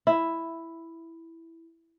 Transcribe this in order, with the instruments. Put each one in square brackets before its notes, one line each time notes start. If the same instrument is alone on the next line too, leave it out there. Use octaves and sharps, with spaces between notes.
[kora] E4